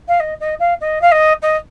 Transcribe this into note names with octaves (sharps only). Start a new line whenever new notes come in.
F5
D#5
D#5
F5
D#5
F5
D#5
D#5